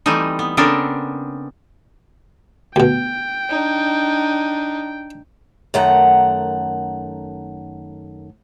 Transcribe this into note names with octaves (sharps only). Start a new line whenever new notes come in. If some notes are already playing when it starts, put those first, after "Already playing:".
E3 G3 A3 C4 D#4
B3
C#3 B3 C4 D4 A4 A#4
D2 B2 G5
D4 D#4
F#2 D#3 A3 F#5 A#5